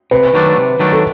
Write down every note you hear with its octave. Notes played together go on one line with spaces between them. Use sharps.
C3 B4
D#3 F#3 A3 D4
C3
D#3 F#3 A3 D4
A4